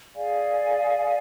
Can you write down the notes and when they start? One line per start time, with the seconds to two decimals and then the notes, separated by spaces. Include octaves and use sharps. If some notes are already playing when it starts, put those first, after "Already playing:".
0.15 G#4 D5 F5 G#5